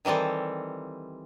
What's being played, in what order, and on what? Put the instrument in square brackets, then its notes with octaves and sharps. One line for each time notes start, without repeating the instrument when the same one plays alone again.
[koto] D#3 E3 G3 C4 A4